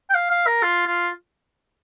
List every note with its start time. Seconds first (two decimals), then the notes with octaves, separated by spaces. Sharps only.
0.10 G5
0.15 F5
0.31 F5
0.46 A#4
0.63 F4
0.87 F4